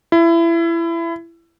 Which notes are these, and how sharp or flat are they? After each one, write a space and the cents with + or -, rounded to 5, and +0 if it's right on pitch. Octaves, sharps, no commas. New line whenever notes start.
E4 +25